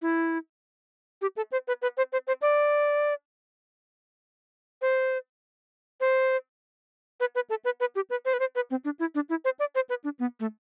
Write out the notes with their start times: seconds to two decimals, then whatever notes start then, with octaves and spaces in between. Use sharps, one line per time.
0.02 E4
1.22 G4
1.37 A4
1.52 C5
1.68 B4
1.82 B4
1.97 C5
2.13 C5
2.27 C5
2.42 D5
4.82 C5
6.01 C5
7.20 B4
7.35 B4
7.50 A4
7.65 B4
7.80 B4
7.96 G4
8.10 B4
8.25 C5
8.34 B4
8.40 C5
8.55 B4
8.71 C4
8.85 D4
8.99 E4
9.15 D4
9.29 E4
9.45 C5
9.60 D5
9.75 C5
9.90 B4
10.04 D4
10.19 B3
10.40 A3